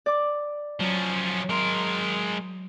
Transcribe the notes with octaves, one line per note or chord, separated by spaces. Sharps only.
D5 D6
F3 F#3 C#4
G#3 A#4 C6